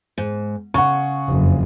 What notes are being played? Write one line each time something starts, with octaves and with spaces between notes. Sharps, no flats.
G#2
C#3 F#5 C#6
F#1 F2